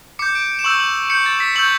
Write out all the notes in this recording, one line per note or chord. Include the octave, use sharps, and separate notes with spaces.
D6 G6 C#7
D7
E7
C#6 E6 G6 F#7
F#7
D6 G6 C#7
A6
B6
C#6 E6 G6 F#7